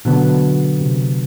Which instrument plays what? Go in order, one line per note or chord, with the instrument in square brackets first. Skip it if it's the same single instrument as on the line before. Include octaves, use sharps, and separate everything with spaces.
[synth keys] B2 [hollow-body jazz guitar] D3 F#3 B3
[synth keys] C3